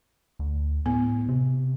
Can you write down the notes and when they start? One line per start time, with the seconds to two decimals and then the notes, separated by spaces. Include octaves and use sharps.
0.39 D2
0.86 A2 B3
1.29 C3